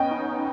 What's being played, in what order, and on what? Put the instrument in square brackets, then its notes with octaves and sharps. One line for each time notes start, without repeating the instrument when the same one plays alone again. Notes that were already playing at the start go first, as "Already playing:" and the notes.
Already playing: [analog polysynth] B3 C#4 [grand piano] D#5 G5
[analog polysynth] D#4